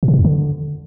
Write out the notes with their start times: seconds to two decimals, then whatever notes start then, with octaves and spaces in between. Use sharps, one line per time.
0.03 A#2
0.08 C3
0.14 A#2
0.19 E2
0.25 D3